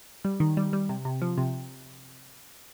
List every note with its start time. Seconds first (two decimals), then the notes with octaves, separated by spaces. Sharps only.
0.25 G3
0.40 D#3
0.57 G3
0.73 G3
0.89 C3
1.05 C3
1.22 F3
1.38 C3